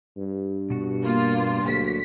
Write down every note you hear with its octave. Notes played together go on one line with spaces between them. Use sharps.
G2
B2 F#4
A#3 F4
D2 F#3 A#3 F#4 B6